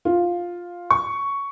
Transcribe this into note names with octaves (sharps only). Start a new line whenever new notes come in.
F4
C#6